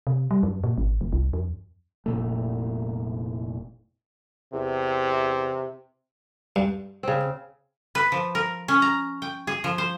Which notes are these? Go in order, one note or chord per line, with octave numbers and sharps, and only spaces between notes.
C3
G3
F#2
A#2
G#1
F1
C2
F2
F1 A#2 A3
E2 C3
G2
C#3 C4
B4
F3
A#4
C#4
A#5
G5
G#4
F3
C5